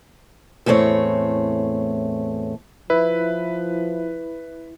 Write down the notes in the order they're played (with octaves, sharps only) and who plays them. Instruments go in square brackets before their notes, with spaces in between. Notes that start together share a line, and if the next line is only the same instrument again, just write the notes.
[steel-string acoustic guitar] E2 A2 A3 C4 C#5
[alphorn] F3 [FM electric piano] E4 [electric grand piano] B4